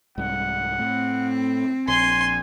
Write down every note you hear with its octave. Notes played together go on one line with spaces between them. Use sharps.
C2 G#2 G3 F#5
A2 C4
A#1 G#5 C6